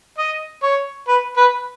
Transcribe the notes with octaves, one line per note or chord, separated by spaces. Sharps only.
D#5
C#5
B4
B4